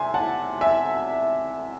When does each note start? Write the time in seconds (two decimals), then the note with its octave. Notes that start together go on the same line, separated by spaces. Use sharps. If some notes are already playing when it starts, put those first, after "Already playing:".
Already playing: C3 E5 G#5 C6
0.14 F#5 A5
0.61 E5 G#5